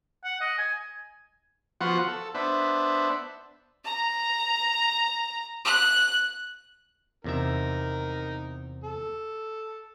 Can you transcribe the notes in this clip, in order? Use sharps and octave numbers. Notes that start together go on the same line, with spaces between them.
F#5
D#5
G#5
F3 B3 F4 F#4 F#5
A4
B3 D4 C5 E5
A#5
F#6
E2 C3 D#4 A#4 E5
A4